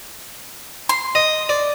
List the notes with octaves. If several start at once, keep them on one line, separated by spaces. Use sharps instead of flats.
C6
D#5
D5